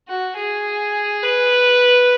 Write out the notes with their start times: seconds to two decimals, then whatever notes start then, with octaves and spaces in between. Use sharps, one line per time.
0.08 F#4
0.36 G#4
1.23 B4